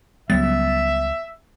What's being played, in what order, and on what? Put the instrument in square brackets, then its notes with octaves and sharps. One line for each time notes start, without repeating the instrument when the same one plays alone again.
[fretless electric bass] C#2 F#3 G3 [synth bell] B3 A6 [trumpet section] E5